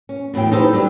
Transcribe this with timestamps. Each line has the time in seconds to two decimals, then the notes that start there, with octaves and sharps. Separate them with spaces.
0.09 C#4
0.34 E2 A2 F#3 E4 G5
0.52 D#4 E4 G4 A4 B4 C5
0.73 F#3 G3 D4